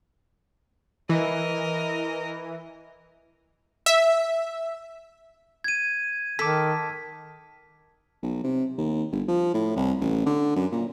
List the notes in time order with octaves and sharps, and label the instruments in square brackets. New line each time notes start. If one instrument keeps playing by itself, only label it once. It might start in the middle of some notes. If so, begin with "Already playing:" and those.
[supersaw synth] E3 [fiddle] A#4 D#5
[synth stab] E5
[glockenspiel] G#6 D#7
[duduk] D#3 [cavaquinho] A4 [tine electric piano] A5 D6 [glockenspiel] B6
[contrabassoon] B1
C3
D#2
G1
F3
A2
C2
A1
D3
F#2
A#2